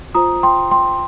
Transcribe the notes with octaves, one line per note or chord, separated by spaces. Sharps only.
F4 C5 A#5 D#6
G5 C6
G5 C6